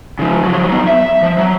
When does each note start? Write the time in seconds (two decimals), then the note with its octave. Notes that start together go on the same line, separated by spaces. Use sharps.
0.19 C#3 F3
0.44 F3 F#3
0.69 F#3 B3
0.87 E5
1.23 F3
1.38 F#3